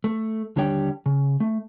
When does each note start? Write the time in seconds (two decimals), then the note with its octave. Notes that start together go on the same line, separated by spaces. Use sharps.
0.04 A3
0.56 D#2 D3 G3 C#5 G5
1.06 C#3
1.40 A3